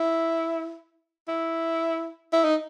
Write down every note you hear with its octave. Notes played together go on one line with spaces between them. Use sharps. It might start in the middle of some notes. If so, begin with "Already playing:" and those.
Already playing: E4
E4
E4
D#4